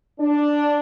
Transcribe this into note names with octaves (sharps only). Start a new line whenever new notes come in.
D4